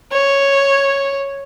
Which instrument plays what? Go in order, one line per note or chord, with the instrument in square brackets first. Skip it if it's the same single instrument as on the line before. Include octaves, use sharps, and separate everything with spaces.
[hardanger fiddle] C#5